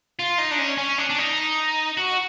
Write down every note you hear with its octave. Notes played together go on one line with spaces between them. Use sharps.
F4
D#4
D4
C#4
C#4
D4
D4
D#4
F#4